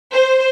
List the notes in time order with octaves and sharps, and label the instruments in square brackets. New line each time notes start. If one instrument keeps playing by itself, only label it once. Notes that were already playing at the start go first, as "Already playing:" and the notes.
[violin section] C5